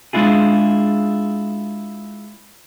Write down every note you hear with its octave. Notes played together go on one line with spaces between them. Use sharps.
G#3 D4 E4 F4 G#4